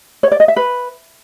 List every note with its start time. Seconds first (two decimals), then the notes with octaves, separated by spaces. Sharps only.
0.23 C#5
0.32 D5
0.40 D#5
0.48 E5
0.56 B4